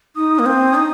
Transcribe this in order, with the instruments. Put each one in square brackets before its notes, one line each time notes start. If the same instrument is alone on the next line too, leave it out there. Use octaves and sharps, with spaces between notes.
[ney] D#4 [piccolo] D#6
[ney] A#3
C4
D#4